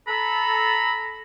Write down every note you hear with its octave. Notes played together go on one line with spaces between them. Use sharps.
A4 A#5 B5